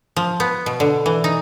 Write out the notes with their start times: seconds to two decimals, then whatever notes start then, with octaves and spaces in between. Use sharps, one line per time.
0.16 F3
0.40 B3
0.66 B2
0.80 D3
1.06 E3
1.24 D#4